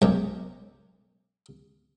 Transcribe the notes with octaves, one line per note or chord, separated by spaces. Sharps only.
B1 F#2